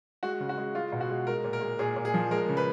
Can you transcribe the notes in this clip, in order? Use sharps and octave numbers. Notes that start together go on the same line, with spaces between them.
G#3 F#4
C#3
F#4
G#3
G#3 F4
B2
F#4
G#3
G#3 A#4
A#2
A#4
G#3
A#2 G#4
A#2
G#4
F3
G#3 A#4
C#3
B4